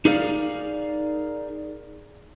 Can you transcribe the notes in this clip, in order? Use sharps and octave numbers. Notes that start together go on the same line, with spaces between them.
D#4 G#4 A#4 D5 F5